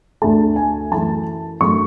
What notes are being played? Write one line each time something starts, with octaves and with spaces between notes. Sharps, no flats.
D2 D3 A3 A5
G#5
F#2 E3 A3 A5
F#2 D3 A3 C#6